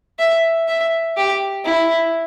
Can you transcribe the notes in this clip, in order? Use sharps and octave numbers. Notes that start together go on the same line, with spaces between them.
E5
E5
G4
E4